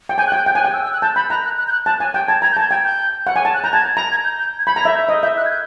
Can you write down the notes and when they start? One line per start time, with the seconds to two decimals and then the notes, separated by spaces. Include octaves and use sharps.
0.09 G5
0.18 G#5 G6
0.27 F#6
0.32 G5 G6
0.46 G5 G6
0.55 G#5
0.60 F#6
0.65 G5
0.73 E6
0.84 E6
0.93 F#6
1.02 A5 G6
1.16 B5 G6
1.30 A#5 F#6
1.44 F#6
1.58 F#6
1.67 G6
1.72 F#6
1.86 A5 F#6
2.00 G#5
2.14 G5 G6
2.28 A5 G#6
2.42 A#5 G#6
2.52 G6
2.57 A5 G#6
2.70 G5 G#6
2.85 G6
3.27 F#5
3.36 G#5
3.45 A5
3.54 F#6
3.63 A#5 G6
3.73 A5 G#6
3.97 A#5
4.11 G#6
4.24 G6
4.39 G6
4.58 G#6
4.67 B5 G6
4.76 A#5
4.81 G#6
4.85 E5
4.95 G6
5.09 D#5
5.23 E5 G6
5.37 F#6
5.46 G#6
5.51 G6